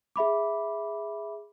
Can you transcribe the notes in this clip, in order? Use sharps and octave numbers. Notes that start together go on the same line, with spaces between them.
G#4 E5 B5 D6